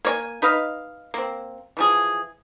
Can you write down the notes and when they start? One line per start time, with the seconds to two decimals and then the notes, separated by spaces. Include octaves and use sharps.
0.05 A#3 C#5 G#5
0.42 D#4 B4 D#5 F5
1.14 A#3 C4
1.77 E3 F3 G#4